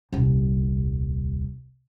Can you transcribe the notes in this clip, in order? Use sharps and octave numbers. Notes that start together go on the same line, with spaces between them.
D#1 C2